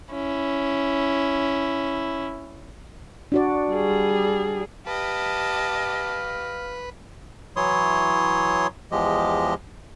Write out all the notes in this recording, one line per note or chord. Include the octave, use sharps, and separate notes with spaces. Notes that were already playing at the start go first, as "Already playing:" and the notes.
C#4 E4
D4 F#4 D5
G3 G#4
G4 B4 D#5 F5 A5
E3 F#3 E4 C#5 C6 D#6
E2 F3 G#3 G4 D#5